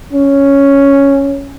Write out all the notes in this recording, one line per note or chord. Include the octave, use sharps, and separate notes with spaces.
C#4